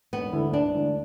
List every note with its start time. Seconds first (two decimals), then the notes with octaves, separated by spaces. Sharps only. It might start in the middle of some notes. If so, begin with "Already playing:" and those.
0.13 E1 B3
0.32 D2 D3 A3 E4
0.53 E1 D4
0.74 D2 D3 A3 E4